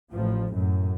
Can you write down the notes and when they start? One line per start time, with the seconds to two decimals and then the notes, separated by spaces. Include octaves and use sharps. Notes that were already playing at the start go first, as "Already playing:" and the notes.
0.12 A1 F3
0.54 F#2 A2